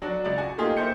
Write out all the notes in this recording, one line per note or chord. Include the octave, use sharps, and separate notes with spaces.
F#3 D4 F#4
C#2 D5
F#4 G#5
A3 A#3 D#4 F4 G4 G#4
A#3 E4 C5 G6 C#7